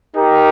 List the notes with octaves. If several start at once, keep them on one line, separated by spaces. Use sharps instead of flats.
D#4 G4 A#4